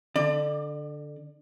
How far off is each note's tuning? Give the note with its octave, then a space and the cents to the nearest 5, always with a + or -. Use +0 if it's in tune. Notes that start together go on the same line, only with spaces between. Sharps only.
D3 +0 D5 +35